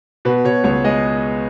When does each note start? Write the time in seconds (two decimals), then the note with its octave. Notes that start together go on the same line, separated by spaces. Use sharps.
0.25 B2 B4
0.45 B2 C#5
0.64 C#2 C#5
0.84 G#3 D#5